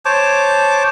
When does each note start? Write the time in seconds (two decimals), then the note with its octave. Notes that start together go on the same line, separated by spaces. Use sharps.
0.05 C5 C#5 A5 D6